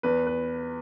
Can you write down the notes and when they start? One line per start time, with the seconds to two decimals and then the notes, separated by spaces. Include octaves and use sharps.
0.03 E2 B4
0.27 B4